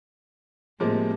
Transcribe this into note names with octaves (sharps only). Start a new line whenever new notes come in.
A2 C3 F3 G#3 A#3